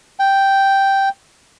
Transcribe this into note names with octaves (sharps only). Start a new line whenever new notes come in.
G5